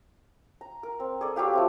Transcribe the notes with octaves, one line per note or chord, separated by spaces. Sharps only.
A#5
A#4
C4
G#4 A4 D5
F#3 G3 G4 F5
F3 A3 C4